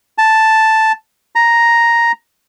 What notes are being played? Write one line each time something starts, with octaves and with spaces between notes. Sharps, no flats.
A5
A#5